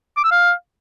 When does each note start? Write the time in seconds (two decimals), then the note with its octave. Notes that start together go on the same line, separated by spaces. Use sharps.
0.17 D6
0.24 E6
0.31 F5